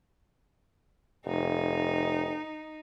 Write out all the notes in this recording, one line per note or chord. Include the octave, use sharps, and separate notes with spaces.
F1 D#4